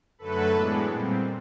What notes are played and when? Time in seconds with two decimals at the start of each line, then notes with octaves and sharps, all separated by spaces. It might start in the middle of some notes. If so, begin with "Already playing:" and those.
0.18 F#2 D3 F#3 A3 A4 B4
0.52 A2 E3 G#3 B3 D4
0.86 A#2 G3 C4